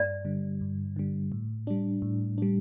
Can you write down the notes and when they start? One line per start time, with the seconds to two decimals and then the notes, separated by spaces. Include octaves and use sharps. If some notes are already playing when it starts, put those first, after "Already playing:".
Already playing: G2 D5
0.25 D3 G3
0.61 G2
0.96 D3 G3
1.32 A2
1.67 G3 D4
2.02 A2
2.38 G3 D4